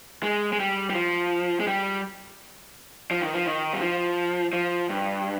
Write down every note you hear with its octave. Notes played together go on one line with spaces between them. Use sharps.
G#3
G#3
G3
G3
F3
G#3
G3
F3
D#3
F3
D#3
G3
F3
F3
G2